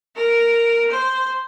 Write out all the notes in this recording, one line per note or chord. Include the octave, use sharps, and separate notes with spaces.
A#4
C5